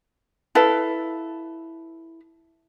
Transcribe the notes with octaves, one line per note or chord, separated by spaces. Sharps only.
E4 A4 B4 F5